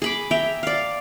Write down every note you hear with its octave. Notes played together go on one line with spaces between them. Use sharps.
G#4 B5 D6
E5 G5 A#5
D5 F5